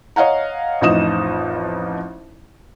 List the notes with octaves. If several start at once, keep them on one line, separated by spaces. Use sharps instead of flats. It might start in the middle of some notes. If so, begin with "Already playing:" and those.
C#5 D#5 F5 F#5 A#5
A1 F2 D#4 D#5 D#6 E7